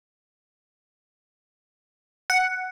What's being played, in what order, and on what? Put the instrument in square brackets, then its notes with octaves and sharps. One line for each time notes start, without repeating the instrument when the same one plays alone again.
[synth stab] F#5